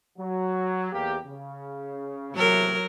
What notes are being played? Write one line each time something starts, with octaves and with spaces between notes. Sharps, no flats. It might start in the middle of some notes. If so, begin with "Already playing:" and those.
F#3
E2 A#3 G4
C#3
E2 A2 C3 F#3 A#4